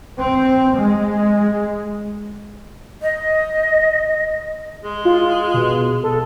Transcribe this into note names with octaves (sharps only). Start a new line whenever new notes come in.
C4
G#3
D#5
G#3
F4
B2
A4